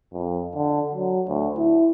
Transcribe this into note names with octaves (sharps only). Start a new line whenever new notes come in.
F2
D3
F#3
D2
E4